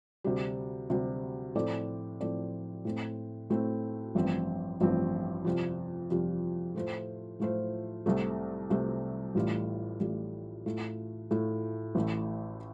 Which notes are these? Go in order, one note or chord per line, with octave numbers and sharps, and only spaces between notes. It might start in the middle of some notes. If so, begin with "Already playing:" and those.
D2 C3 G3
D2 C3 G3
A2 F3 C4 A4 D5
A2 F3 C4 A4 D5
A2 A3 C4
A2 A3 C4
A1 G2 F3 C4
A1 G2 F3 C4
F2 C3 G3 F4
F2 C3 G3 F4
A2 A3 F4 C5
A2 A3 F4 C5
C2 C3 A3
C2 C3 A3
A1 A2 G3 F4
A1 A2 G3 F4
A2 A3 F4
A2 A3 F4
A1 A2 A3